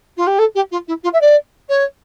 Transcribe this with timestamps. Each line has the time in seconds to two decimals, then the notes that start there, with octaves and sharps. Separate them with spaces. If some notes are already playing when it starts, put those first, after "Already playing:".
0.17 F4
0.27 G4
0.38 A4
0.55 G4
0.71 F4
0.87 E4
1.03 F4
1.13 E5
1.21 D5
1.69 C#5